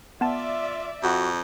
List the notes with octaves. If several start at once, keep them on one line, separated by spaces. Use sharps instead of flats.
B3 F4 D5 E5 A5
F2 F#4